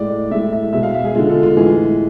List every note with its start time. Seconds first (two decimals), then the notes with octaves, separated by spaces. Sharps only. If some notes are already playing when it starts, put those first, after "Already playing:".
Already playing: A2 G#3 D5
0.31 A2 G#3 E5
0.52 E5
0.73 B2 G#3 E5
0.83 F5
0.94 E5
1.05 G#4
1.15 D3 G#3 F4
1.29 A4
1.43 F4
1.57 A2 E3 G#3 G#4